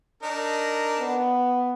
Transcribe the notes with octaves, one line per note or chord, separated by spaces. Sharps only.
D4 D#4 A#4
B3